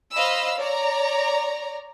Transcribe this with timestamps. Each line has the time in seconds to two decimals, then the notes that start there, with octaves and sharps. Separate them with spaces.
0.13 C5 D#5 F5 B5 E6
0.57 C#5 D5 A#5